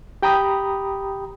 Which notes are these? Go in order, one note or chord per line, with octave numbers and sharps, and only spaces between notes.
G4 G5 A#5 B5 D#6